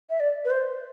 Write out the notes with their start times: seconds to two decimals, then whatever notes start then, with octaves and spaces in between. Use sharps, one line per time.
0.10 E5
0.20 D5
0.45 B4
0.50 C5